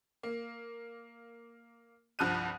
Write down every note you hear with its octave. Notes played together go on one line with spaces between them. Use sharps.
A#3
C2 G2 F3 D#6 F#6 D#7